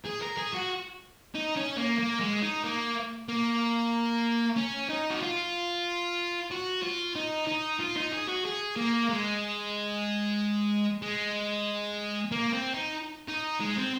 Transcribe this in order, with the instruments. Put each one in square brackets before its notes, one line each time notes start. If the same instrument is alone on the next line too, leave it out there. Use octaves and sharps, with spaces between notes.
[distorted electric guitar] G#4
A#4
G#4
F#4
D#4
C#4
A#3
A#3
G#3
D#4
A#3
A#3
C#4
D#4
F#4
F4
F#4
F4
D#4
D#4
F4
D#4
G#4
F#4
G#4
A#3
G#3
G#3
A#3
C4
D#4
D#4
G#3
C4